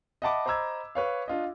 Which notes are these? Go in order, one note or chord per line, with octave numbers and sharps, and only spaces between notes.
D#5 E5 F#5 A5 B5 D6
C5 D#5 A#5 B5 E6 G#6
B4 C#5 F5
D4 F4 D#5